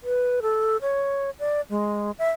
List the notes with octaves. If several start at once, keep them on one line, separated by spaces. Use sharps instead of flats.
B4
A4
C#5
D5
G#3
E5